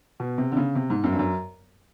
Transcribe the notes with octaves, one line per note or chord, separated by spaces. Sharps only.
B2
C3
D3
C#3
C3
G#2
F#2
G2
F#2